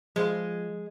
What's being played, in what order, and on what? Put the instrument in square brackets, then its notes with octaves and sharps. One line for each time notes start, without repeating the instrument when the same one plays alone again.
[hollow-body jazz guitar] F3 C5 F5 [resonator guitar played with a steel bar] G#3